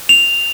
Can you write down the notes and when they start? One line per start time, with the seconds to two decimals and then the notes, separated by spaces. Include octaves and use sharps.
0.09 F7